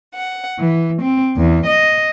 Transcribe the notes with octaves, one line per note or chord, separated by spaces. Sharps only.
F#5
E3
C4
E2
D#5